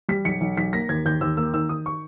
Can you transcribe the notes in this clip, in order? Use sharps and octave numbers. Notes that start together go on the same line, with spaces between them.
G3 B6
B1 C#7
B1
B1 B6
A#3 A#6
D#2 G#6
D#2 G6
D#2 E6
A#3 E6
D#3 E6
D#3 D#6
C#6